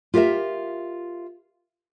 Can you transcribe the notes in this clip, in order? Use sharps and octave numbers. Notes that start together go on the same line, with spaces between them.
F4 G4 A#4 D#5 E5